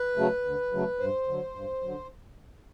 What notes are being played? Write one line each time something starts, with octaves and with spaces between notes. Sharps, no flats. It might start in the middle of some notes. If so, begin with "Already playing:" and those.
Already playing: B4
C#3 F#3 A3
D2
C#3 F#3 A3
G2 C5
D3 F#3
G2
D3 F#3